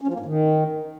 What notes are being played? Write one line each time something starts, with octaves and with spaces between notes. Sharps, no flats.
C#4
F3
A#3
G#2
D#3